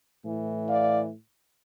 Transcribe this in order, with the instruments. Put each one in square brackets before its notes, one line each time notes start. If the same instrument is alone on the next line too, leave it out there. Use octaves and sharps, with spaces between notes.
[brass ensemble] A2 E3
D5 F5